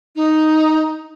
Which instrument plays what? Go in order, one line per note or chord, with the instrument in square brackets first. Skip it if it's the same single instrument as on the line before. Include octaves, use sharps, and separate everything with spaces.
[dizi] D#4